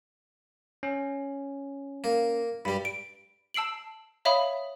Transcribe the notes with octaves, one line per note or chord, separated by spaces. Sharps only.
C#4
A#3
G2 G3 B5
D7
A5 E6 C7 D7 F#7
C#5 E5 F5 B5 D#6